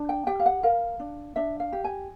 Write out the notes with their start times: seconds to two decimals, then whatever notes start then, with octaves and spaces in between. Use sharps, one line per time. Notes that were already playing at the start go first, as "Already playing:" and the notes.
Already playing: D4
0.09 G5
0.27 G4 G5
0.40 F5
0.46 F#5
0.63 A#4 F5
1.00 D4
1.36 D4 E5
1.60 F5
1.73 G4
1.84 G#5